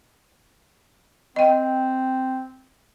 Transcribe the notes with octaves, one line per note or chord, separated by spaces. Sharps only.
C4 D#5 G5